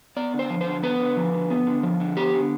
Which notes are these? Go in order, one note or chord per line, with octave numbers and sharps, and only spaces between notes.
B3 D5
D3
C5
F3
C5
D3
B3 B4
D3
F3
D3
B3
D3
F3
D3
B3 G4
D3